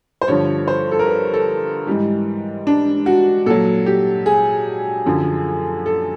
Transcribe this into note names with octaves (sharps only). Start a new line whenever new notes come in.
C5
G2 D3 F3 C#5
C5
A4
A#4
B4
A4
G#2 E3 G3
D4
F#4
A#2 F#3 A4
G4
G#4
F#2 D3 F3
A4